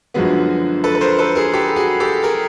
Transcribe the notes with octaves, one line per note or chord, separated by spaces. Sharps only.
F#2 D3 F3 G#3 B3 F#4
A4 B4
B4
A#4 C5
A4 B4
G#4 A#4
G4 A4
F#4 G#4
G4 A4
G#4 A#4